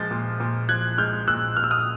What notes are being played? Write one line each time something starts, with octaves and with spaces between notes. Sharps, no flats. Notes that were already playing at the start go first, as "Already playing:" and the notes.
Already playing: A#2 F3 G#3 G6 A6
A#2
A#2
F3 F#6 G#6
G#3 F6 G6
A#2 E6 F#6
A#2 F6
E6
D#6 F6